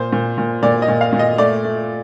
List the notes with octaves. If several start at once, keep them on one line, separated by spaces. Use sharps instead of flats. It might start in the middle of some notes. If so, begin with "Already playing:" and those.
Already playing: A#2 C5
A#2
A#2
A#2 D5
D#5
A#2
F5
A#2
D#5
A3 D5
A3